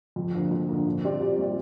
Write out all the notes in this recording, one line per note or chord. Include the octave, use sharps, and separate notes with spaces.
F2
D3 F3 A#3
F2
D3 F3 A#3
A#2
G3 C4 G4 D5
A#2
G3 C4 G4 D5